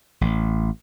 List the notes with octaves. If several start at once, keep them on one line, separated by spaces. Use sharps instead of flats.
A1